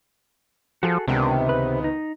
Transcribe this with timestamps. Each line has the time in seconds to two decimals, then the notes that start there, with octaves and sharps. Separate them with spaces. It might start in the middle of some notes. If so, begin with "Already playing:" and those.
0.83 F3 F#4 G#4 A4
1.08 C#2 C3 D#3 B3 D4
1.49 B4
1.84 D#4